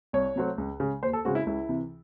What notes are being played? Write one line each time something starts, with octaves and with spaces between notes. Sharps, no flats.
C2 C#5
C3 F#3 A3 C4
C#2
C#3 G#3
D#2 C5
A4
C#3 G#3 C4 F#4
E4
C#2 E4
C3 E3